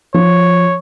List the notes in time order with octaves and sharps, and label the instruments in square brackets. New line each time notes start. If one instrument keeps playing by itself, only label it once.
[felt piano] F3 [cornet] C#5